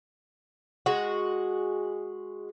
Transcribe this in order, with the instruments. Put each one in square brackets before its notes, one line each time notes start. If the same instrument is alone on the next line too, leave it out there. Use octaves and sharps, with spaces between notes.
[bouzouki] G#3 F#4